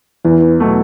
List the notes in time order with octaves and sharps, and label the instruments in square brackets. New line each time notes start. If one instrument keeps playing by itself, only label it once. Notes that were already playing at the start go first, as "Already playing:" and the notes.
[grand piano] E2 [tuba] E3
[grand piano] B2 F#3 A3